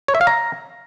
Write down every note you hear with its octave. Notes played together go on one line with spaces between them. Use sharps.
C#5
E5
F5
A#5